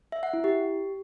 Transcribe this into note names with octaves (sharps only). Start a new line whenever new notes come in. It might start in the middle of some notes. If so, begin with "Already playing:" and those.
E5
F#5
E4
G4